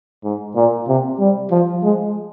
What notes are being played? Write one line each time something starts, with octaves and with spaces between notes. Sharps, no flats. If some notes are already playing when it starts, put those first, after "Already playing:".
G#2
A#2
C3
G3
F3
G#3